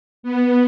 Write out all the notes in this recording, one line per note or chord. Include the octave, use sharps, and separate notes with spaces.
B3